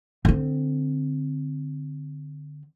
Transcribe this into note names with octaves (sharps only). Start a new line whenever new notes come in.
D3 C4